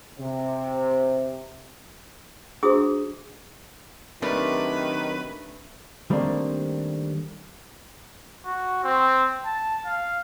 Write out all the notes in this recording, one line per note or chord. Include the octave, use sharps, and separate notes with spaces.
C3
D4 E4 F#4 G#4 C5 D#6
D#3 F#3 G3 A3 C4 D4 A#4 B4
D#3 G3 A3 A#3 C4 D4
F#4
C4
A5
F5